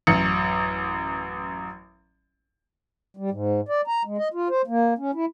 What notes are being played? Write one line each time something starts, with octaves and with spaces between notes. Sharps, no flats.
A1 F#2 C#7
G3
G#2
D5
A#5
G#3
D#5
F4
C5
A#3
C#4
E4